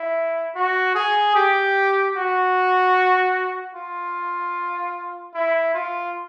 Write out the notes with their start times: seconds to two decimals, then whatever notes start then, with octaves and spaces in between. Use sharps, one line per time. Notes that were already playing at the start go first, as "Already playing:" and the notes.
Already playing: E4
0.55 F#4
0.95 G#4
1.35 G4
2.16 F#4
3.75 F4
5.34 E4
5.74 F4